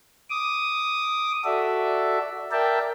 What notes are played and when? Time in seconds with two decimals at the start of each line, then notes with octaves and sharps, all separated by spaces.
0.30 D6 D#6
1.44 F#4 A4 D5 E5
2.52 A#4 D5 E5 G5 A5